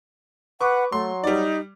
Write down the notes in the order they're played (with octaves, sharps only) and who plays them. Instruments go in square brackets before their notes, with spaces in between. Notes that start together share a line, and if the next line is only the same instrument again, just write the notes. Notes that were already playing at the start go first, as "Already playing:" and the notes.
[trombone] B4 [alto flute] F#5 [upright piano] C#6 D6
[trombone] F#3 [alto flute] A3 [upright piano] C6
[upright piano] G3 D5 [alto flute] D#4